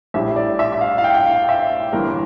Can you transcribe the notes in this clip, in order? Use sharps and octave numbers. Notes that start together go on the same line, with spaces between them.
A#1 A2 G3 E5
D5
E5
E5
F5
F5
G5
G5
F5
E5
G1 G2 E3 A#3 A#4